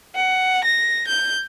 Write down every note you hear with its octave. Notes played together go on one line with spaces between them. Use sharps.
F#5
A#6
G6